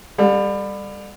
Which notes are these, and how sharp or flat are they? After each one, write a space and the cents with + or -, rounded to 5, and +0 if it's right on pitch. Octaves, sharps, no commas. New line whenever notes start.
G3 +25 A4 +0 F#5 -45